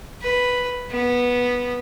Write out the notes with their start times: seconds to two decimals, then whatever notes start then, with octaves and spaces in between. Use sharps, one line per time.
0.22 B4
0.90 B3